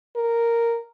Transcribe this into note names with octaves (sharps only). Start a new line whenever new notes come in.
A#4